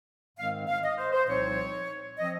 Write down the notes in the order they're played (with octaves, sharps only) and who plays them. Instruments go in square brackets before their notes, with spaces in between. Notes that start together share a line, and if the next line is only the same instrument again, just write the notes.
[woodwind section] G#2 D#3 G#3 C4 F5
F5
D#5
C5
C5
C2 A#2 F3 C4 D#4 C#5
F3 C4 D#5